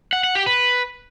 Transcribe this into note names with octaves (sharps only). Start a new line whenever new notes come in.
F#5
F#5
G4
B4